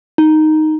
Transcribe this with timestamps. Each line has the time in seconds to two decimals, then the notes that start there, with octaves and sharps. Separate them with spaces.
0.18 D#4